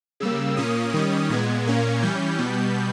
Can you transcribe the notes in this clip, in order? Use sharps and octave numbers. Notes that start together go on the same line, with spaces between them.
C#3 G3 A#3 E6
A#2 A#3 C#4 D#6
D#3 G3 C#4
A#2 G#3 B3 G#6
A#2 A#3 C#4
E3 G3 C#4 G6
B2 G3 B3